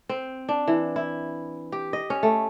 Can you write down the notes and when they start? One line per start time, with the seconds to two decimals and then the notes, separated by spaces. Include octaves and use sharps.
0.09 C4
0.49 D4
0.68 E3
0.96 E4
1.72 G4
1.93 D#5
2.10 C#4
2.23 A3